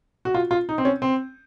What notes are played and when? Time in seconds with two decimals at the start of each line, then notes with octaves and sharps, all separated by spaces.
0.25 F#4
0.34 F4
0.51 F4
0.69 D#4
0.78 C4
0.85 C#4
1.02 C4